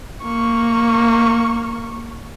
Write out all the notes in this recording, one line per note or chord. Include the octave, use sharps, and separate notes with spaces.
A#3 C#6